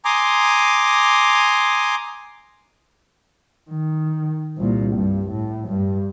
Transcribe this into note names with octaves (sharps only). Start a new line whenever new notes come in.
G#5 A#5 C6 D6 D#6
D#3
C2 A#2
G2
A2
G2